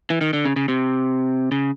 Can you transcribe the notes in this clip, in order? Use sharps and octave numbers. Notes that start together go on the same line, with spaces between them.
E3
D#3
D3
C#3
C#3
C3
C#3